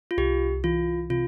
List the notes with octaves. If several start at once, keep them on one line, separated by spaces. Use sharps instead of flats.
F4
C2 G4
E3 F4
C3 F4